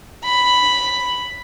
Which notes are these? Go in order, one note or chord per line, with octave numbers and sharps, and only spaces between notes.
B5